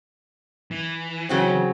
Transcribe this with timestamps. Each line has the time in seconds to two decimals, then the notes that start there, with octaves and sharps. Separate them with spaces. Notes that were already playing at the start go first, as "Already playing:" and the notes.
0.71 E3
1.29 C#3 F#3 C4